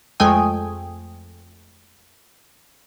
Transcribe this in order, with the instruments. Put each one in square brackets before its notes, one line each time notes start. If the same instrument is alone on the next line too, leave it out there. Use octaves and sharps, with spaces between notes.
[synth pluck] F2 G#3 A3 G5 G#5 D#6